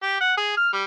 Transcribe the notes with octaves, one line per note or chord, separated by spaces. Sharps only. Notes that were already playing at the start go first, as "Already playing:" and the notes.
G4
F#5
G#4
F6
G3